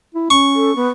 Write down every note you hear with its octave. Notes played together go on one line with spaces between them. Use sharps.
E4
C#4 C#6
A4
B3